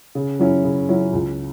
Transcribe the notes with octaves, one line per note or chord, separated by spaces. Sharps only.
C#3
F#3 C#4 E4
C#3
F#3 C#4 E4
C#2